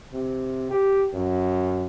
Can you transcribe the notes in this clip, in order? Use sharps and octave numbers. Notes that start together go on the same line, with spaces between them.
C3
G4
F#2